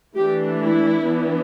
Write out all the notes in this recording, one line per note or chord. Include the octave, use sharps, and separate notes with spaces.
E3 A3 D4 G4
E4
E3 B3 D4